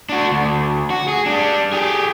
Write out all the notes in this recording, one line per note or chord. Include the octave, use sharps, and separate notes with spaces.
D4 F#4
D2
F#4
G#4
G3 D4
G4 G#4